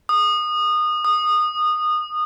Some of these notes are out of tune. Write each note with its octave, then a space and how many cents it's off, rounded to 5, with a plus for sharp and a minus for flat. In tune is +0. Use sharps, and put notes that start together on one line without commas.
D#6 -25
D#6 -20